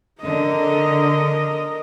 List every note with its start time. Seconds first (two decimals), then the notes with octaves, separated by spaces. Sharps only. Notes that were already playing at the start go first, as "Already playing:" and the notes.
0.22 D3 A#4 D#5